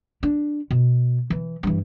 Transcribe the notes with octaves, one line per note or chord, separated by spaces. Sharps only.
D4
B2
E3
G2 E3